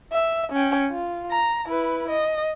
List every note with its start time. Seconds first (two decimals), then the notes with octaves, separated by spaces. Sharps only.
0.13 E5
0.53 C#4 G5
0.90 F4
1.31 A#5
1.67 E4 B4
2.10 D#5